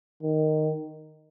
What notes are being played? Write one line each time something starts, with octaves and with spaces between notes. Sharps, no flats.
D#3